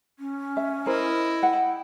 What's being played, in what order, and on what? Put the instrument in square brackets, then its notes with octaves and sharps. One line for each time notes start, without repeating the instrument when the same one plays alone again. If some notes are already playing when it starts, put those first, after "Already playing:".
[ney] C#4
[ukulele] E5
[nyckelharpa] E4 D#5 [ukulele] A#4 C5
[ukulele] F#5 [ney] G5